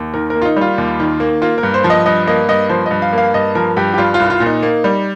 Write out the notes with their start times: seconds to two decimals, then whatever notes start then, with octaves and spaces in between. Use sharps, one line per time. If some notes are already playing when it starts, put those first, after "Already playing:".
Already playing: D#2
0.14 D#3 A#4
0.30 A#4
0.35 A#3
0.42 F4
0.45 D#4
0.56 G3 F4
0.78 D#2
1.00 D#3
1.20 A#3
1.42 A#3 F4
1.58 A#4
1.63 G2
1.74 C5
1.84 F3
1.90 D#5
2.06 G2 D#5
2.27 A#3 D#5
2.49 G2 D#5
2.69 F3 C5
2.86 G2 D#5
3.02 F5
3.13 A#3
3.18 F5
3.34 G2 D#5
3.55 F3 A#4
3.77 G2 G4
3.94 G4
3.98 G3 F4
4.14 F4
4.20 C2
4.30 F4
4.40 A#2
4.46 D#4
4.63 A#3
4.84 G3